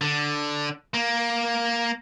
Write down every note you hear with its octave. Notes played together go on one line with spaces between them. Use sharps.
D3
A#3